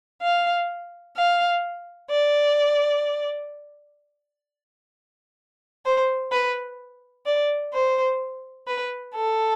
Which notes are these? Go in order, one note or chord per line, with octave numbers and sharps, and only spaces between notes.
F5
F5
D5
C5
B4
D5
C5
B4
A4